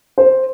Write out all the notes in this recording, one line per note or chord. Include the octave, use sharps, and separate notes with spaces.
C5